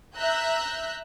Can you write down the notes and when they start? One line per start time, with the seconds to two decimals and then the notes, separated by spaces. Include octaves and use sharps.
0.17 E5 A#5 E6 F#6 G6